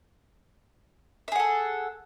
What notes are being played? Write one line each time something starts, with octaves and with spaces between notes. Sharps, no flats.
G#4 A4 E5 F#5